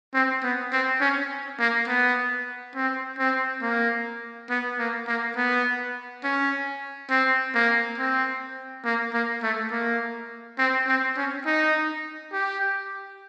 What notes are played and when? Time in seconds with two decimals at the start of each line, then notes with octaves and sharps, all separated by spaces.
0.14 C4
0.43 B3
0.73 C4
1.01 C#4
1.60 A#3
1.88 B3
2.75 C4
3.19 C4
3.62 A#3
4.50 B3
4.79 A#3
5.08 A#3
5.37 B3
6.24 C#4
7.10 C4
7.55 A#3
7.98 C4
8.85 A#3
9.14 A#3
9.43 A3
9.71 A#3
10.58 C4
10.87 C4
11.17 C#4
11.46 D#4
12.33 G4